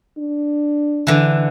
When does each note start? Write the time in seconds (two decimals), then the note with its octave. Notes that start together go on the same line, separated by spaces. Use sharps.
0.18 D4
1.07 D3 E3